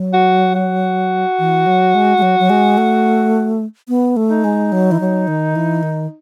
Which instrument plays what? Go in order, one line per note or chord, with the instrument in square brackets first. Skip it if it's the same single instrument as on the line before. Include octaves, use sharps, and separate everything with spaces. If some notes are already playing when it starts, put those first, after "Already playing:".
Already playing: [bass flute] F#3
[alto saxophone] F#4
F#4
[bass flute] E3
F#3
G#3
G#3
F#3
F#3
G#3
A3
B3
A3
[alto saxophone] D#4
[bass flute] G#3
F#3
E3
F#3
D#3
E3
D#3